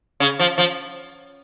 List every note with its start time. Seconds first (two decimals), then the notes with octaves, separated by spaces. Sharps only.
0.20 C#3
0.39 F3
0.58 F3